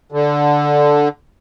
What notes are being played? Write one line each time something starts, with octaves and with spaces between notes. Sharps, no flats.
D3